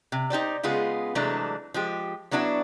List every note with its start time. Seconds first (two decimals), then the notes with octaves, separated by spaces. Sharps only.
0.12 C3
0.30 D#4 G4 C5 D5
0.63 C#3 G#3 B3 F4 G#4
1.15 C3 E3 F#3 G#3 A3 D4
1.74 F3 G#3 G4
2.31 F#3 B3 D4 E4 F#4